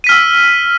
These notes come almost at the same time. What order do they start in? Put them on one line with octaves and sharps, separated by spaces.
D#7 B6 F6 E6